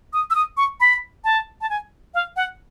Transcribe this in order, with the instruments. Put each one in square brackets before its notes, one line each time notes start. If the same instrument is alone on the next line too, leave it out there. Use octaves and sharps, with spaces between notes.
[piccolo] D#6
E6
D#6
C#6
B5
A5
A5
G#5
F5
F#5